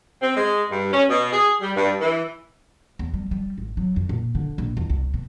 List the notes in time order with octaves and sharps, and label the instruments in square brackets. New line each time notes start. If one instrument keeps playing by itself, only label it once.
[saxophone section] C4
G#3
G2
C#4
B2
G#4
G3
G2
E3
[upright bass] E2
G3
G3
G#1
F#3
F2
A#2
D3
A#1
E2
C2
B2